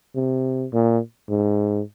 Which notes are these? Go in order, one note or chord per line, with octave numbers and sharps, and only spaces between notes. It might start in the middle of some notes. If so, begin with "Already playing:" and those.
C3
A#2
G#2